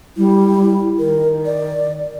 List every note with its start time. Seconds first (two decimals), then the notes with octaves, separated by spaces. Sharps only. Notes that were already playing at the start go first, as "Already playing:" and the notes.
0.17 G3 E4
0.99 D#3 A#4
1.45 D5